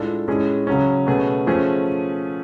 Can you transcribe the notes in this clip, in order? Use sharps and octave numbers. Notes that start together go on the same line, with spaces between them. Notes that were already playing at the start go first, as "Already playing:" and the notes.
Already playing: A2 G#3 D4 F4 A4
A2 G#3 C#4 G#4
C#3 F#3 C#4
B2 A3 C#4 G#4
F3 A3 C#4 G#4